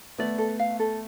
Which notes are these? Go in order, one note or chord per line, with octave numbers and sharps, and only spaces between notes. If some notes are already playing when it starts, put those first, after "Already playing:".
A3 B3 D5
A4
F5
A4